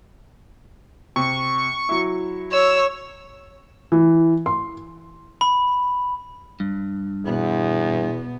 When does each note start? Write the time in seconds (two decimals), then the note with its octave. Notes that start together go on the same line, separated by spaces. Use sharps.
1.16 C3 C#6
1.89 F#3 E4
2.53 C#5 E6
3.92 E3
4.46 C6
5.41 B5
6.60 G2
7.25 E2 B2 B3